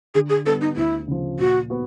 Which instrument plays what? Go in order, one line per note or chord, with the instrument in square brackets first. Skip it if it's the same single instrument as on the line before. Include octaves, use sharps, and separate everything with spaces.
[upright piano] D3 [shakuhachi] G#4
[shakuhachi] G#4
[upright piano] G3 B3 D4 [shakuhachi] A4
[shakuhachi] D#4
[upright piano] D2 [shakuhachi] E4
[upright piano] C#3 F3
[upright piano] A#2 [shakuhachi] F#4
[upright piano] B3 F#4